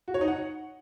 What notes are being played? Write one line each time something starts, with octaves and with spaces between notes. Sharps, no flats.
F#4
C#5
D#4
F#5